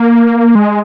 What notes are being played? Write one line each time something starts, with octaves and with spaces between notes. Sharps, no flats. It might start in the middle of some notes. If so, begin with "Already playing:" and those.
Already playing: A#3
G#3